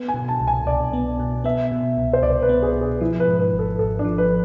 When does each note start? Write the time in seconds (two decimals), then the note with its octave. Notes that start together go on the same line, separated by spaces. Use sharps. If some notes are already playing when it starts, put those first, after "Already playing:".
Already playing: B3
0.08 G#5
0.14 B2
0.28 A5
0.40 C2
0.47 G#5
0.67 C2 D5
0.93 B3
1.19 B2
1.44 B3 E5
1.72 B2
1.97 C2
2.13 C5
2.22 C2 D5
2.42 B4
2.49 B3
2.62 G#4
2.75 B2
2.81 G#4
3.01 F3 E4
3.20 B4
3.27 G#2
3.39 B4
3.52 G#1
3.59 A4
3.79 G#1 A4
3.99 D4
4.05 F3
4.18 B4